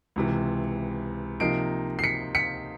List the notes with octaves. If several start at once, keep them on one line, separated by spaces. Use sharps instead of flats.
C#2 C3 E3
C3 F3 A#3 D#4 C7 D7
C7
B6 C#7
B6 C#7